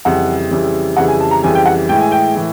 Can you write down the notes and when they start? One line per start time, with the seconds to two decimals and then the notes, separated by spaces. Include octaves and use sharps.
0.05 F2 C#3 E3 G3 F#5
0.51 F2 C#3 E3 G3
0.97 F2 C#3 E3 G3 F#5
1.08 G#5
1.20 A5
1.31 A#5
1.42 F2 C#3 E3 G3 G#5
1.55 G5
1.65 F#5
1.89 A2 E3 G#3 G5
2.00 G#5
2.12 G5
2.35 A2 E3